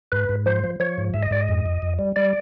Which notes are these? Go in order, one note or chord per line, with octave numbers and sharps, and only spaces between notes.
G#2 B4
G#2
F3 C5
F3
F3 C#5
G#2
G#2 E5
D#5
G#2 D5
D#5
F2
F2
F2
G3
G3 D5